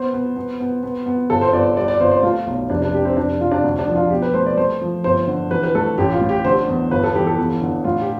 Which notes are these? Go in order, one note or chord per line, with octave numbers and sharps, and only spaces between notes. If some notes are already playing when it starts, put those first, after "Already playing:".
Already playing: B3 C5
B3
B3
B3
B3
B3
G1 A4
C5
G1 D5
G3 D5
D5
G1 C5
C5
A3 F4
B1
F1 D4
D4
C3 G4
C4
F1 D4
F1 F4
D4
D2
D4
F3
F4
B2 G4
B4
A3 C5
D5
A3 C5
F3
G1 C5
D3
E3 B4
B4
A3 A4
A1 G4
F4
A2
G4
D3 C5
E2
G1 B4
A4
E3 G4
A4
E2
D3
A2 F4
G4